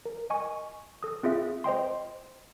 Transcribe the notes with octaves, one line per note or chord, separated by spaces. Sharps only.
A#4
D#5 G#5 C#6
A4 D#6
C4 F4 G#4 E5
C5 D#5 G5 C6